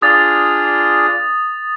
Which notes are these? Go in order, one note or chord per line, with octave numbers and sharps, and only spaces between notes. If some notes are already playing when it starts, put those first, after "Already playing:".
D4 F4 G#4 D#6 A6